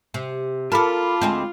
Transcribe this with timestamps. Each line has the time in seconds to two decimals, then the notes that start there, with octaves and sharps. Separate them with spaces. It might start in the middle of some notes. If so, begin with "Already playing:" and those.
0.14 C3
0.72 F4 A4 A#4 A5 B5 D6
1.22 D2 G#3 C4